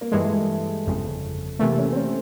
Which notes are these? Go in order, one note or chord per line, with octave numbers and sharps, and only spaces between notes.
A#3
G2 E3 G#3 A3
G1 F2 C#3
C3 E3 A3 A#3
C#4
C4
C#4